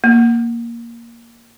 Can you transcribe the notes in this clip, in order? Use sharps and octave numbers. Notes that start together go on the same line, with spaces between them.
A#3